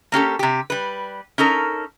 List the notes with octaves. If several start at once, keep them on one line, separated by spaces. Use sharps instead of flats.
A#3 C#4 G4 A4
C3 G4
G3 B4
C#4 D#4 A4 A#4